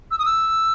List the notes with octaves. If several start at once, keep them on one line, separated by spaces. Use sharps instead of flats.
E6
D#6
E6